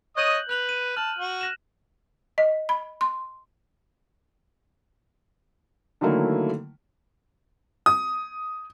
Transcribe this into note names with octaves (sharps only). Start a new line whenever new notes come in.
C#5 D#5 D#6 F#6 G6 F#7
B4 F#6 F7 F#7
D#7
A5 F6 F#7
F#4
F#6 A#6 E7
D#5
B5
C6
D3 D#3 F#3 A3 A#3 E4
D#6